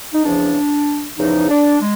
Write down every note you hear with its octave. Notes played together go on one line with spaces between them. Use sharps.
D#4
E2 C#3 F3 D4
E2 C#3 F3 D#4
D4
G#3